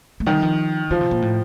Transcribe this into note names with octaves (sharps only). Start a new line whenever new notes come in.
A3
D#3 G3
F3
D3 F3
C3
A#2
A2